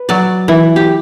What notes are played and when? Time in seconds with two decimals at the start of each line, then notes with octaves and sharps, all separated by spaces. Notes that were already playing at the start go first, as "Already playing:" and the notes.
Already playing: B4
0.09 F#3 D5
0.48 E3 E4
0.76 G4